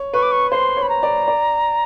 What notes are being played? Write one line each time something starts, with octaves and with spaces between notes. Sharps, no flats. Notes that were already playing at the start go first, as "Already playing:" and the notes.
Already playing: C#5
B4 C#6
D6
C#6
C5 C6
C#5
B5
A#5
D5
D5